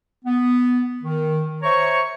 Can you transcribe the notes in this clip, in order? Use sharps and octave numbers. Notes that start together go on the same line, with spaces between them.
B3
D#3
C5 C#5 E5 A#5 C#6